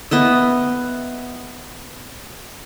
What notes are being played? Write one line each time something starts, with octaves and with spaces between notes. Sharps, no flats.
B3 D#5 E5